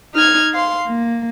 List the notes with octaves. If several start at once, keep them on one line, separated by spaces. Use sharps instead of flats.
D#4 F6 G#6
F5 C6
A#3